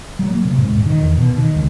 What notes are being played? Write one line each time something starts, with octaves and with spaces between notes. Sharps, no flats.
F#3
A#3
C3
G#2
D#1
D#3
E2
B2
D#3
C#2